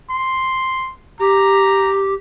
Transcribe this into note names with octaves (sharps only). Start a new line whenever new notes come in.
C6
G4 A#5